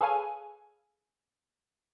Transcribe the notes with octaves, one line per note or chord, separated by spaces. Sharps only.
G#4 A4 B4 C#5 F5 G#5